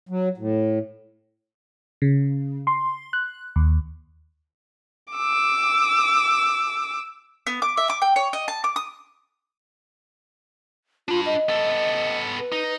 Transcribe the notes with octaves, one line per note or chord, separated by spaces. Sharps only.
F#3
A2
C#3
C6
F#6
D#2
D6 E6
B3
D6
E5
D6
G5
C#5
D#5
A5
D6
D#6
D4 F4 B5
D#5
B3 A4
B4
D#4